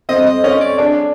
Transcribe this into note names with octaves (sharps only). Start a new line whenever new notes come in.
C4 D#5
D#5
C#4 D#5
D5
D4 G#4